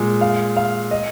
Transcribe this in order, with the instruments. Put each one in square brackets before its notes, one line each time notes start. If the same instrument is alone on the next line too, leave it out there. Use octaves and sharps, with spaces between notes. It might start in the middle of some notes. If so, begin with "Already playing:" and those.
Already playing: [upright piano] A#2 G#3
F5
F5
D#5